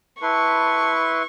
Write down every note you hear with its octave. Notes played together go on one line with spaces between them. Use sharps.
E4 B4 A5 C6 C#6